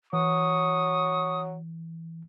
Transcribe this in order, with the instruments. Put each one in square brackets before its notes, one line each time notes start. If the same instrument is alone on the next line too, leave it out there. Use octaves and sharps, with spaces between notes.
[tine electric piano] E3 [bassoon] F#3 [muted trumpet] C#6 [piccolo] D#6